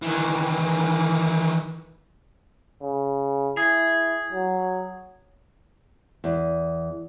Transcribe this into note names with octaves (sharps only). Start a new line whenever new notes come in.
D#3 E3
C#3
E4 G#4
F#3
E2